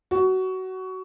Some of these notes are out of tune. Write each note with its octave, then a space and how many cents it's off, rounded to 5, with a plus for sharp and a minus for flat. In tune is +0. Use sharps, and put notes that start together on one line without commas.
F#4 +20